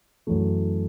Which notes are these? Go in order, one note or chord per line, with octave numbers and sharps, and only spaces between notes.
F#2 E3 A3